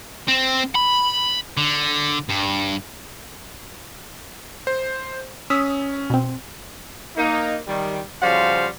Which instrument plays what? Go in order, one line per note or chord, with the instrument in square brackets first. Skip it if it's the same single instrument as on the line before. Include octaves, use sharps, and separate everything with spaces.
[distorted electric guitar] C4
B5
D3
G2
[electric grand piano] C5
[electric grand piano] C#4 [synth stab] D#6 E6 B6
[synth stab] B2 C4
[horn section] A#3 D#4
D#3 G3
C#3 F3 G3 F#4 C5 F5